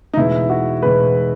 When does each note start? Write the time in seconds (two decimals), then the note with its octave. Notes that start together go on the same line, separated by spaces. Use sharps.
0.13 D#4
0.17 E2 B2 G#3 E4
0.50 F#4
0.82 E2 B2 G#3 B4